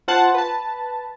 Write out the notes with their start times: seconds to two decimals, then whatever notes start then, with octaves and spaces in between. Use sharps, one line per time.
0.08 F4 C5 F#5 A5
0.35 B4 A5